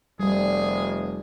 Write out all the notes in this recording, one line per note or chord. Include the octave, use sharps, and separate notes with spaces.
F1 G3 G#4